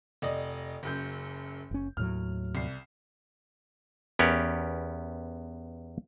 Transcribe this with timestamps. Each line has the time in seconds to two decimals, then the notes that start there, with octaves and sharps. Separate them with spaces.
0.22 F1 D5 D#5
0.83 F#1 F#2 G6
1.71 F#1 C#4
1.97 D#2 A2 F#3 F6
2.55 C2 C7
4.19 E2 B3 C#4 G4 A#4